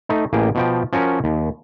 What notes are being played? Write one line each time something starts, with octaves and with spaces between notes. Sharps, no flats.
A3 D#4
A1 A#3 G#4 G5
B2 F3 G5
F3 C#4 F#4 A#4
D#2